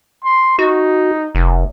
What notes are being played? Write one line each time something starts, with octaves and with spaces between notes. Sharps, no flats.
C6
D#4 F#4
F1